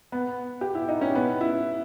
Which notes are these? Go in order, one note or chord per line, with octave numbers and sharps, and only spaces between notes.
B3
G4
E4
D#4
C#4
B3
E4